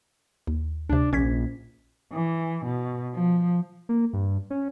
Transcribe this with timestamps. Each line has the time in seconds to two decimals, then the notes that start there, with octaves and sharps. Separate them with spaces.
0.47 D#2
0.90 D2 C3 D4
1.13 A#1 C#4 G#6 B6
2.12 E3
2.66 B2
3.14 F3
3.89 A#3
4.13 G2
4.50 C#4